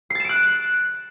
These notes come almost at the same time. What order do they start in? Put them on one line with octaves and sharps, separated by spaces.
C7 A6 E7 D7 F#6